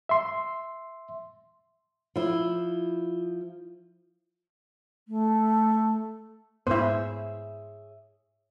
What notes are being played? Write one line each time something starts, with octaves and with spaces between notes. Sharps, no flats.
E5 C6
F3 E4
A3
G#2 B3 E4 G#4 C5 C#5 E5